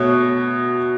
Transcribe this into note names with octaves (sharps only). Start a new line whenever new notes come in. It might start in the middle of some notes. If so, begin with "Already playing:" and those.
Already playing: B2 A3 C#5